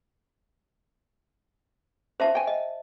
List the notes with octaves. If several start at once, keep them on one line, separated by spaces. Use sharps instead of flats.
C#4 D4 F4 C5 E5 A5
G5 G#5
D#5